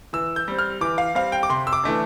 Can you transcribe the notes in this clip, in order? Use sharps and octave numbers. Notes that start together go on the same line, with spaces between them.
E3 E6
G6
G3 C4
F6
E3 D6
F5
G3 C4 F5
G5
D6
C3 C6
E6
D6
E3 A3 D4